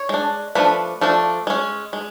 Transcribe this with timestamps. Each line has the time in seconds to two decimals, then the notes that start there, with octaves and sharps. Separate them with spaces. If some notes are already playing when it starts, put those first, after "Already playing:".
Already playing: C#5
0.09 G#3 D4
0.55 F3 A3 D4 B4
1.01 F3 A3 D4
1.47 G#3 C#4
1.93 G#3